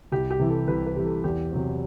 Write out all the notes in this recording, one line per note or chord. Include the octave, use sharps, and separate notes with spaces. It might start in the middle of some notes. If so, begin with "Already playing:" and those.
C2 G4
G4
C3 E3
A4
C2 B4
B4
C3 E3
A4
E2 G4
C3 F#3 C4